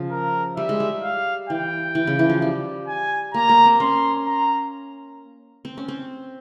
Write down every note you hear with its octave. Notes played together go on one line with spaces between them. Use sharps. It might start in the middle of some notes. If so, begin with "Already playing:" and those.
Already playing: C#3 F3
A#4
G3 E5
G#3
G3
F5
E3 G5
E3
C#3
E3
F3
G3
G#5
A#3 A#5
A#3
C4
C#4 C6
A#5
C4
C#4
C4